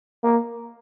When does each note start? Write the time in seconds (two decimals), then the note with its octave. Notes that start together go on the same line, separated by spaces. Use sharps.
0.24 A#3